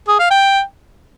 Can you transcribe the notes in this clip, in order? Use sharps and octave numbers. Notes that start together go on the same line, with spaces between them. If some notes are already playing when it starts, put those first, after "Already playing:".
G#4
F5
G5